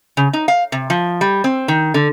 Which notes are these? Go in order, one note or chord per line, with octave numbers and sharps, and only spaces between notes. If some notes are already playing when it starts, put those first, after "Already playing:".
C#3
D#4
F5
C3
F3
G3
C4
D#3
D3